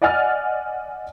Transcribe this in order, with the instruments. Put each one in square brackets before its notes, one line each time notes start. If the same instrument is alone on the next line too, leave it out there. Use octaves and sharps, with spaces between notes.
[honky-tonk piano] D5 D#5 F#5 G#5 F6 A6